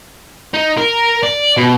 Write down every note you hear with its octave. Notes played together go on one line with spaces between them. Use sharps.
D#4
A#4
D5
B2